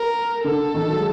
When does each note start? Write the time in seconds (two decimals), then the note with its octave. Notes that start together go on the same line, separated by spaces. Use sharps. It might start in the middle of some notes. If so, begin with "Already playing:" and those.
Already playing: A#4
0.44 D3 A4
0.74 D#3
0.89 F#3
0.96 G#3